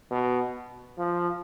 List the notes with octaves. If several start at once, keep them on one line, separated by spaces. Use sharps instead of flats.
B2
F3